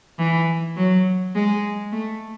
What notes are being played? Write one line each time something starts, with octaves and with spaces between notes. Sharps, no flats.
E3
F#3
G#3
A3